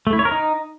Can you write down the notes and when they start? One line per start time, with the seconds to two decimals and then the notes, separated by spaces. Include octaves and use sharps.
0.07 A3
0.13 E4
0.19 C#5
0.25 A#4
0.31 D#4